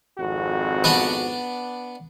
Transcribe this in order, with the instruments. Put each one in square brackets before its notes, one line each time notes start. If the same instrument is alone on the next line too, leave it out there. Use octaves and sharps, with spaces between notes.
[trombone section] G#1 F2 F#4
[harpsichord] B3 D4